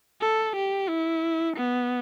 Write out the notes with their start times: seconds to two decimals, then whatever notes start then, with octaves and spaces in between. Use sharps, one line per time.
0.21 A4
0.55 G4
0.88 E4
1.56 B3